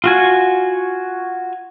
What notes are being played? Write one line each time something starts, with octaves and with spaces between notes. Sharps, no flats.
F4 F#4 G#5